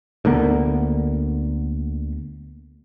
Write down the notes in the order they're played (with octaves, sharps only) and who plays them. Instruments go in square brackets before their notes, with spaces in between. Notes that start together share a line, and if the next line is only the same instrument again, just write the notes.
[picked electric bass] D2 D3 A#3 B3